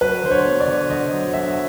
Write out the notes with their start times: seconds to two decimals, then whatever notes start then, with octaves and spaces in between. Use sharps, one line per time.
0.01 F#3 B4
0.23 D3 C5
0.31 C#5
0.46 B3
0.60 D5
0.67 D3
0.90 D3 D#5
1.13 F#3
1.34 D3 E5